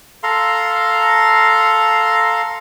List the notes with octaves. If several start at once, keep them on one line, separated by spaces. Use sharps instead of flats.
A4 F5 A#5 C6